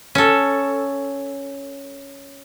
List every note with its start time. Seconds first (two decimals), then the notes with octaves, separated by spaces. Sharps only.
0.15 C#4 A4